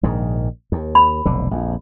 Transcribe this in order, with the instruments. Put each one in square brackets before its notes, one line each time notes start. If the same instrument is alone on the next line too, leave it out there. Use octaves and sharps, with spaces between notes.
[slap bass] A#1 G#2 D#3
D#2
[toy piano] B5
[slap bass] F1 B1 D3
A#1 F2